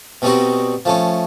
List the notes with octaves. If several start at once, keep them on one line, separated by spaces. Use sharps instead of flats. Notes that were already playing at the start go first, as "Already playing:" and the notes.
B2 G3 C4 D#4 F#4
F3 A3 C#4